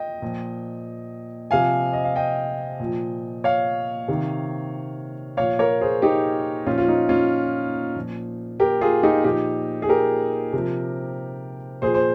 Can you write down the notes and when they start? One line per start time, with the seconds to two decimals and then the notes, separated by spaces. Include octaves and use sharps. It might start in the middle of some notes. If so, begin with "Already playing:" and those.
Already playing: D#5 G5
0.22 A#2 F3
1.51 C3 F3 F5 G#5
1.93 D#5
2.05 F5
2.16 D#5 G5
2.80 A#2 F3
3.44 C#5 F5
4.08 C3 D#3
5.37 A#2 F3 C#5 F5
5.59 A#4 C#5
5.81 G#4 C5
6.02 D#4 G4
6.66 A#2 F3 C#4 F4
6.78 F4
6.88 D#4
7.09 C#4 F4
7.95 A#2 F3
8.60 G4 A#4
8.81 F4 G#4
9.03 D#4 G4
9.24 A#2 F3 D#4 G4
9.82 G#4
9.89 G4 A#4
10.53 C3 F3
11.82 A#2 F3 G#4 C5
11.94 C5